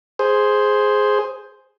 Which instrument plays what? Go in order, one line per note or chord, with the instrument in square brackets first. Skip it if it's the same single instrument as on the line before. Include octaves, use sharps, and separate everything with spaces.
[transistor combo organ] G#4 C5